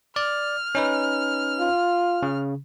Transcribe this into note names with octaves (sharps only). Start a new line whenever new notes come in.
D5 F6
C#4 D#4 B4
F4
C#3